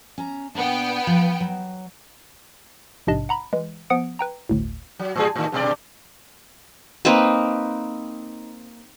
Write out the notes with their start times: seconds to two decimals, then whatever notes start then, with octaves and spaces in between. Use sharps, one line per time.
0.18 C#4 A#5
0.55 A#2 B3 D4 G5
1.07 F3
1.40 F#3
3.07 A#1 G#2 C3 D4 D#5 A5
3.29 F#5 A#5 B5
3.53 E3 G#3
3.90 F3 B3 F#5 D#6 C#7 D7
4.19 B4 G5 A#5
4.49 G1 D2 A2
4.99 F#3
5.16 A2 G3 G#4
5.36 A2 D#3
5.52 G2 B2 D5
7.05 A#3 C4 D#4 B4